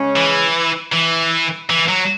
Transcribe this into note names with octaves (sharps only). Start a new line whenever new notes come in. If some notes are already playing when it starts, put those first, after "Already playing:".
Already playing: C#3 G#3 C#4
E3
E3
E3
F#3